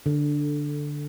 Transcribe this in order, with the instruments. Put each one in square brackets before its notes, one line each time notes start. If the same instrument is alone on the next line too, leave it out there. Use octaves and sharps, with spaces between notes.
[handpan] D3